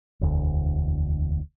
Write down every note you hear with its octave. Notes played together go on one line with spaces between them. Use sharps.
E1 D2